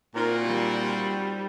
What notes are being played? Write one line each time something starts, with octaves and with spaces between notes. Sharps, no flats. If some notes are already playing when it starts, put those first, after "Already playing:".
A#2 C4 D#4 F4 F#4 A#4
G3